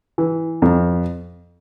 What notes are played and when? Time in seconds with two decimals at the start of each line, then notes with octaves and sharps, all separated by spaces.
0.18 E3
0.62 F2